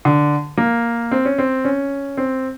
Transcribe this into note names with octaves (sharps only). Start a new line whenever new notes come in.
D3
A#3
C4
C#4
C4
C#4
C4